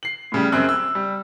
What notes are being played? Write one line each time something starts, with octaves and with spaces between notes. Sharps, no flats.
C7 F#7
A2 C#3 G3
F#2 C#3 C4 E6 F#6
E6
G3